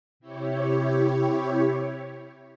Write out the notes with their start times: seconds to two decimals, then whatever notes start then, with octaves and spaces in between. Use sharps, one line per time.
0.20 C3 E4 G4 C#5